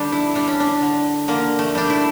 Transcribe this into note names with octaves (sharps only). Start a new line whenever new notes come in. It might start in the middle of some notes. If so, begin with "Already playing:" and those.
Already playing: D3 G3 D4
E4
G3 D4
C#4
D4
D3
D3 A#3
A3
G3 D4
E4